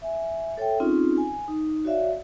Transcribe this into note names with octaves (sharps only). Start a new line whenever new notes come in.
E5 G#5
A4 C#5 E5 G5
C4 C#4 D#4 F4 G#4
G#5
D#4
F#4 C#5 D5 E5 F5